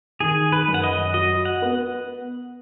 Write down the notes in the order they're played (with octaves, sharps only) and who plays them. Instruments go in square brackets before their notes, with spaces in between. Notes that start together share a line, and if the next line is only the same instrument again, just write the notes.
[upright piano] D#3 [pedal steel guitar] G#4
[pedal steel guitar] B4
[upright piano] F#2
[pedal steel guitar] F#5
D#5
[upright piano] F#4 [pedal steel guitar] D#5
[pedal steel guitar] F#5
[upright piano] B3